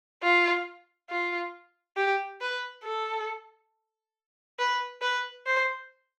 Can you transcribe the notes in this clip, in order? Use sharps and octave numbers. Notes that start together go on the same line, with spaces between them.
F4
F4
G4
B4
A4
B4
B4
C5